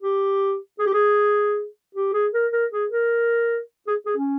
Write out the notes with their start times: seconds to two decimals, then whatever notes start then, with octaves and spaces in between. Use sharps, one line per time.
0.02 G4
0.79 G#4
0.86 G4
0.93 G#4
1.95 G4
2.13 G#4
2.34 A#4
2.52 A#4
2.72 G#4
2.91 A#4
3.87 G#4
4.06 G#4
4.17 C#4